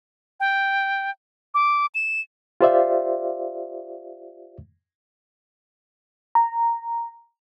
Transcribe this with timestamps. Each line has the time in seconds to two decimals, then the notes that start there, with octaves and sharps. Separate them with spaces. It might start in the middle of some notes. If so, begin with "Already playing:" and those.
0.40 G5
1.54 D6
1.95 E7
2.61 F4 G4 C5 D5 E5 F5
6.35 A#5